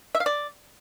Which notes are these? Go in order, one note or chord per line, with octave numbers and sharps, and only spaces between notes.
E5
F5
D5